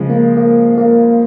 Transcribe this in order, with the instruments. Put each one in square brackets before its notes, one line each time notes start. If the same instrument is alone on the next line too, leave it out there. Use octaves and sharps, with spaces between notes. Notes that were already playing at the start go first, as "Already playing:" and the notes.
Already playing: [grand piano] C#3 F3 G#3
[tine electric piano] A#3
A#3
A#3